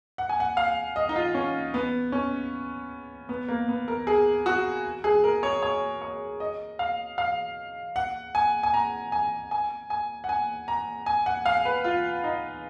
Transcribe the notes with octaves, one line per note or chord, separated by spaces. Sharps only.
F#5
G#5
F#5
F5
D#5
D#4
F4
C#4
B3
C#4
B3
A#3
B3
A#4
G#4
F#4
G#4
A#4
C#5
C#5
C#5
D#5
F5
F5
F#5
G#5
G#5
A#5
G#5
G#5
G#5
F#5
G#5
A#5
G#5
F#5
F5
B4
F4
D#4